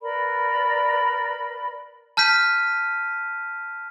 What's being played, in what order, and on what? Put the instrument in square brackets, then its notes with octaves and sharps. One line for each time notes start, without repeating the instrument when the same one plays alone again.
[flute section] A#4 B4 D5 B5
[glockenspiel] A5 F6 G6 B6 D#7